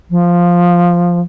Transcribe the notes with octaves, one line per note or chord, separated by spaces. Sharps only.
F3